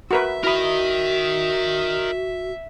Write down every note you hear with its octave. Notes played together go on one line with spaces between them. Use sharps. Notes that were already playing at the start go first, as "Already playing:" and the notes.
F#4 A#4 B4 E5
E4 F#4 A#4 D#5 B5